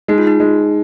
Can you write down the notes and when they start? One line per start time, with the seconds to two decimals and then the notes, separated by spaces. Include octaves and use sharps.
0.08 G#3 D#4
0.18 F4
0.27 D#4
0.40 G#3